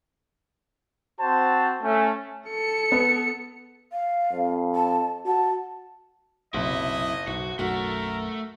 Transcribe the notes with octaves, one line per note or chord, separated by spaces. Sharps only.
C4 F#4 C5 A5
A3 C#4
A4 C#7
B3
F5
F2
A5
F#4 A5
F#1 B1 C3 E4 D#5
B1 F#4
B1 F#2 A3 F#4 A#4